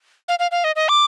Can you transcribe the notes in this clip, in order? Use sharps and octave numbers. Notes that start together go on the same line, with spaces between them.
F5
F5
F5
D#5
D#5
D6